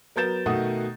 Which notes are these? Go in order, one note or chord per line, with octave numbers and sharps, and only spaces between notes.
F#3 B3 A#4 G6 A6 E7
B2 D#3 A3 F#5 D#6